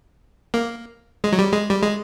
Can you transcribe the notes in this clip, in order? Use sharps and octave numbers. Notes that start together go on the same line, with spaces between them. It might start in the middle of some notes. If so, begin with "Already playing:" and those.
A#3
G#3
F#3
G3
G#3
G3
G#3